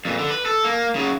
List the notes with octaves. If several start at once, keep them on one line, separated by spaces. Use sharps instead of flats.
F2 A#2
D3
B4
A4
A#3
C#3 F#3